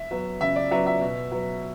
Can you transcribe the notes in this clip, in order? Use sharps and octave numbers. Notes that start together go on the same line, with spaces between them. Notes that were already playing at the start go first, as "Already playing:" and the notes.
Already playing: E5
F#3 B3
C#3 E5
D5
F#3 B3 E5
E5
B2
F#3 B3